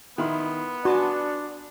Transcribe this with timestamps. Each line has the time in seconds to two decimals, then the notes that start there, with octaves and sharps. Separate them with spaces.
0.18 D#3 B3 E4 C6
0.85 D4 F#4 G#5 A5 C6